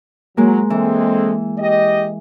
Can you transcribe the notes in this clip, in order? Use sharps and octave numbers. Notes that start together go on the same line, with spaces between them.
F#3 G#3 A#3
E3 G#3 C4 A4
G4 D#5